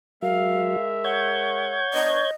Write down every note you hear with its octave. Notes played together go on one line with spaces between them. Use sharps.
F#3 G#3 A#4 E5 F5
C#5 F#5 G6 G#6
B3 D4 D#5